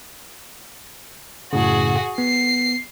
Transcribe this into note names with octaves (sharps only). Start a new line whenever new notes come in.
F#2 A2 C#3 F#4 G#4
B3 C7